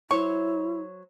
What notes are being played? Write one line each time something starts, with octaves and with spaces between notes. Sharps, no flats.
F#3 E4 C5 C#5 C#6